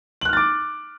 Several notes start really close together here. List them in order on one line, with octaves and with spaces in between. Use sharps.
F#7 F#6 F6 A6 D6